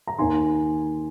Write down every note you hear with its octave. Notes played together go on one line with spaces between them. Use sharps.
A#5
D#2 D#3 G#5 C6